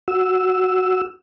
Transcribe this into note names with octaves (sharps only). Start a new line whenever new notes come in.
F#4 E6